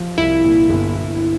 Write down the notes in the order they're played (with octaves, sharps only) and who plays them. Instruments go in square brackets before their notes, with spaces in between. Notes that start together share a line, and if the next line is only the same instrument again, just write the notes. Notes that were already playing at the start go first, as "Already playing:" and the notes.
Already playing: [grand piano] F3
[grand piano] C2 [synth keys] E4
[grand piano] A#2
G1
G1